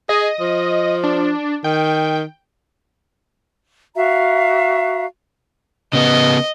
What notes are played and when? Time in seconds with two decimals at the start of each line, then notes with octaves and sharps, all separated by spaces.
0.09 G#4 D#5
0.40 F3
1.04 D4
1.64 D#3 G5
3.95 F#4 E5 F5 A#5
5.93 C#3 B3 D#5